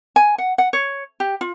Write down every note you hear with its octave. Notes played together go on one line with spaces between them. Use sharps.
G#5
F#5
F#5
C#5
G4
F4